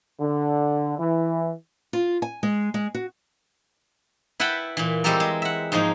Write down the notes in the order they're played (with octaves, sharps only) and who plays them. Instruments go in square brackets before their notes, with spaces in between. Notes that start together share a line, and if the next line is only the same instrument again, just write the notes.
[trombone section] D3
E3
[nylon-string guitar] F4
G#5
G#3
G#3
F#4
[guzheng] E4 B4 F#5 G5 A5 B5
A#2 E3
G3 G#3 C4 G4 A4 A#4
G#3
E5 F#5
G#2 F3 G#3 A#3 D#4